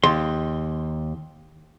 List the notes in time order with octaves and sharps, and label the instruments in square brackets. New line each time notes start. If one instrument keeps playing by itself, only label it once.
[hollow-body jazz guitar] D#2 C6